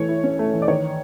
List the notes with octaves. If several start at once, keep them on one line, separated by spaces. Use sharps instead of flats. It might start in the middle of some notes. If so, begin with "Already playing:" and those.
Already playing: E3 A3 C#5
E4
C#4
A3
E3
D5
D#3 C#5